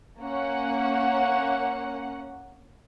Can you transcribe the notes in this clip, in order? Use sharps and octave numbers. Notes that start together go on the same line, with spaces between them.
A#3 C#4 F#5